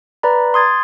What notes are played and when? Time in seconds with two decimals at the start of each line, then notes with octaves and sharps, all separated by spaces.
0.23 B4 D5 A#5 B5
0.54 C6 D#6 G#6 A6